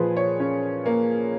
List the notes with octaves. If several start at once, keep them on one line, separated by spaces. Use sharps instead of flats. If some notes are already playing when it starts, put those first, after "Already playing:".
Already playing: A#2 F3 G#4 B4
C#5
C#4
A#3